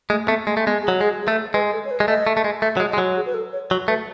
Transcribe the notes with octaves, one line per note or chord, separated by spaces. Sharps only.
G#3 A3
A3 B3
G#3 A3
A3
G#3 B3
G#4
F#3
G#3 G#4
G#4
A3 A4
G#3 B4
A4
C#5
B4
G#3
A3 D#5
A3
A3
G#3
A3 E5
F#3
G#3
D#5
G#3
F#3
G#4
B4
A4
C#5
F#3 C#5
A3 B4